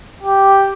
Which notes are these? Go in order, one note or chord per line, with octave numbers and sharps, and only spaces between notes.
G4